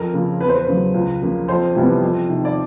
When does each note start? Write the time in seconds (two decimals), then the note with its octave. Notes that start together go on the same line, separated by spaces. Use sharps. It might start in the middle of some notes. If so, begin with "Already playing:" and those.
Already playing: F2 A#4
0.13 C#3 F3 A#3
0.40 E2 B4
0.49 C5
0.57 B4
0.67 C#3 F#3
0.94 C#2
1.22 C#3 F3 A#3
1.48 F2 C5
1.75 C3 E3 G3 B3
2.02 F2
2.29 C3 D#3
2.45 D5